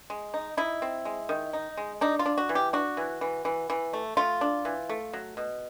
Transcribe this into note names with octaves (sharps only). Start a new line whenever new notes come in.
G#3
D#4
D#4 E4
C4
G#3
D#3
D#4
G#3
D4 D#4
F4
D4
F#4
E3
G4
D4 F#4
E3
E3
E3
E3
A3
A3 F4
D4
E3
A3
F#3
B2